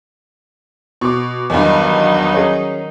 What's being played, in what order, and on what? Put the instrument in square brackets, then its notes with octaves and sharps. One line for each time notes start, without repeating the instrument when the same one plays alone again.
[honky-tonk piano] B2 [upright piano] C#6 D6
[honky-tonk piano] E2 G2 [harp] D#3 [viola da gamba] F#3 D#4
[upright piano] C#4 G#4